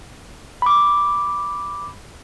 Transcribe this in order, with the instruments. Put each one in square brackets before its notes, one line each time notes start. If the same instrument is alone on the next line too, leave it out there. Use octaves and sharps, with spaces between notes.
[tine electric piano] B5 D6